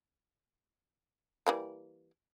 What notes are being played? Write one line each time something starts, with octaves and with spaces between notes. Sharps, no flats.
E3 G3 A#3